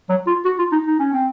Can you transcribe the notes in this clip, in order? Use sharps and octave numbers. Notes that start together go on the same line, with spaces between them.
F#3
F4
F#4
F4
D#4
D#4
C#4
C4